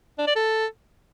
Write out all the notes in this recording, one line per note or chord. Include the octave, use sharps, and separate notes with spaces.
D4
D5
A4